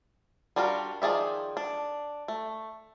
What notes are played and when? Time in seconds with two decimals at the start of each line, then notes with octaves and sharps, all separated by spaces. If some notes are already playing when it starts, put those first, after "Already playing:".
0.56 G3 D4 F4 F#4 A#4
1.02 D#3 F3 G#4 D5 E5
1.57 D4
2.28 A3